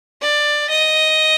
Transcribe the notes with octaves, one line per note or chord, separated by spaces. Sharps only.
D5
D#5